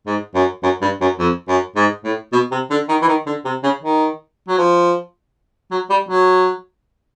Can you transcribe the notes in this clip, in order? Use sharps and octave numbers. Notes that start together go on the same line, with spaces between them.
G#2
F#2
F#2
G2
F#2
F2
F#2
G#2
A2
B2
C3
D3
D#3
E3
D#3
D3
C3
C#3
D#3
F#3
F3
F#3
G3
F#3